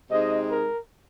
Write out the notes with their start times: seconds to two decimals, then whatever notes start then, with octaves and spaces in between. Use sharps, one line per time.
0.11 C3 G#3 C4 D#4 D#5
0.51 A#4